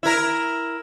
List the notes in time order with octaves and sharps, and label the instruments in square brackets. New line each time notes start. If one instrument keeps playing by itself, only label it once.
[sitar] E4 A#4